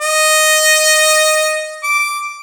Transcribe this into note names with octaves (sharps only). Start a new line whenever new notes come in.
D#5
D6